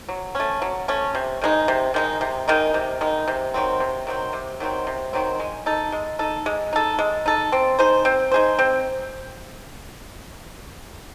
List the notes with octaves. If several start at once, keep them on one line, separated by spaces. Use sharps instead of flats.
F#3
A3 C#4
F#3
A3 C#4
C3
D#3 G#3 D#4
C3
D#3 G#3 D#4
C3
D#3 G#3 D#4
C3
D#3 G#3 D#4
C3
D#3 F#3 C4
C3
D#3 F#3 C4
C3
D#3 F#3 C4
C3
D#3 F#3 C4
G#3
D#4 A4
G#3
D#4 A4
G#3
D#4 A4
G#3
D#4 A4
C4
D#4 G#4 C5
C4
D#4 G#4 C5
C4